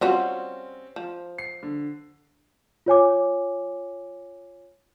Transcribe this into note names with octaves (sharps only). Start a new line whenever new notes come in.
G3 C4 C#4 F4 F#4
F3
C7
D3
F4 C#5 G#5 D6